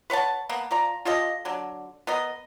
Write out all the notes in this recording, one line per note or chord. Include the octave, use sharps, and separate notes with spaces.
B4 C#5 F#5 A5
A#3 B3
F3 D5 A#5
F4 G4 A4 D#5
D3 F#3
B3 A#4 D#5